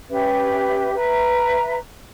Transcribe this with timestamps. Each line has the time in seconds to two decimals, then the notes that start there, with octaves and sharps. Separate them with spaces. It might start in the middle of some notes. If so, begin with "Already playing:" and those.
0.09 C#4 G4 B4 E5
0.93 B4 E5 A#5